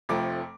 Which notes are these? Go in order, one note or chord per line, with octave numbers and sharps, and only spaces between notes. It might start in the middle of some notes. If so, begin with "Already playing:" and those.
F1 F2 F3 A3 D6